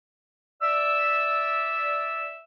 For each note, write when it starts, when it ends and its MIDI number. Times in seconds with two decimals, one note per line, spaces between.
0.62 2.44 74
0.62 2.44 76
0.62 2.44 88